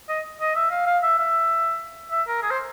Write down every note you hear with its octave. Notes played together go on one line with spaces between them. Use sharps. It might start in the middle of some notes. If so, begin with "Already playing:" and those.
D#5
D#5
E5
F5
F5
E5
E5
E5
A#4
G#4
C5